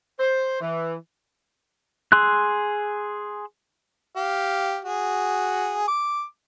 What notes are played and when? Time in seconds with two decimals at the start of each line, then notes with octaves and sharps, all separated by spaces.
0.20 C5
0.61 E3
2.12 G#4 C6 E6 F#6
4.16 G4 F5
4.85 F#4 G#4
5.88 D6